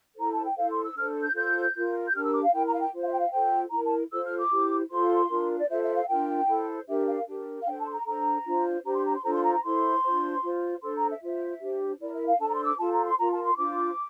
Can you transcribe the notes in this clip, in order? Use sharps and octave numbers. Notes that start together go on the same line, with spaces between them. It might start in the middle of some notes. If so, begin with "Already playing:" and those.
E4 A4 C5 A#5
A5
G5
E4 A4 C5 F5
C6
E6
D4 A4 C5 F6
G6
F4 A4 C5 G6
F4 A#4
G6
D4 G4 A#4 F6
E6
D6
F5
E4 A#4 G5
A#5
F5
G5
F4 C5
F5
E5
G5
F5
F4 A4 C5 G5
E4 A#4 A#5
A5
F4 A4 C5 E6
F6
D6
E4 G4 C5
F4 A4 C5 C6
D4 F4 A#4
D5
F4 A4 C5 E5
E5
F5
D4 F4 A#4 G5
E4 A4 C5
D4 G4 A#4 E5
F5
D4 G4 A#4
F5
D4 A4 C5 G5
A5
C6
A#5
D4 A4 C5 A#5
D4 F4 C5
D4 G4 C5 A#5
C6
A#5
C6
D4 F4 A4 C5 A#5
C6
A#5
A#5
E4 A4 C5 C6
D4 F4 C5
F4 C5
D4 A4 C5 C6
A#5
E5
F4 C5 E5
D4 G4 C5
E4 A#4 D5
E5
F5
D4 A4 C5 A5
A#5
C6
E6
D6
F4 A4 C5 A5
A#5
C6
F4 A#4 A#5
A5
C6
D4 F4 C5 D6